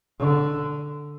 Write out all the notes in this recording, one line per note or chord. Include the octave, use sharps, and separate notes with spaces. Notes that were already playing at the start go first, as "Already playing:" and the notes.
D3